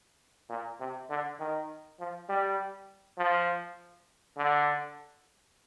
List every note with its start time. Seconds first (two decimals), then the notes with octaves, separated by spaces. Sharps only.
0.50 A#2
0.80 C3
1.10 D3
1.39 D#3
2.00 F3
2.29 G3
3.18 F3
4.37 D3